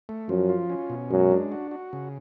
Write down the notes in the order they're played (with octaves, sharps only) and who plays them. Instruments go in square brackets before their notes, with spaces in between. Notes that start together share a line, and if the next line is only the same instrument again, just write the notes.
[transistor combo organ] A3
[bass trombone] F#2 [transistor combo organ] F3
[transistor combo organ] F4
C#4
B2
[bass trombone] F#2 [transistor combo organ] G#3
[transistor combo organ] D4
F#4
F#4
C#3